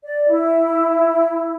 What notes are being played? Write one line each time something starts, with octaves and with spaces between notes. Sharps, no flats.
D5
E4